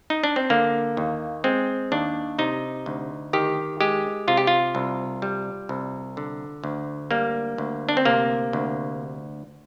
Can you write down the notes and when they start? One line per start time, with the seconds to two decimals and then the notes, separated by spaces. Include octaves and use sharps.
0.10 D#4
0.24 D4
0.36 C4
0.50 D3 A#3
0.97 D#2
1.44 G#3 C4
1.92 D#2 D4
2.39 C3 D#4
2.86 D2
3.33 D#3 G4
3.81 G#3 G4
4.28 C3 F4
4.37 G4
4.47 F4
4.75 C2
5.22 G3
5.69 C2
6.17 D3
6.64 D2
7.11 G3 A#3
7.58 D2
7.89 D4
7.97 C4
8.05 C3 A#3
8.53 D2